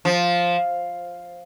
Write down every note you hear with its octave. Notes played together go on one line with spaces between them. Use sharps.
F3